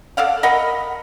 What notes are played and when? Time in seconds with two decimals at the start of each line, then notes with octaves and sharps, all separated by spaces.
0.17 A4 D5 F5 F#5
0.43 A#4 D#5 F#5 B5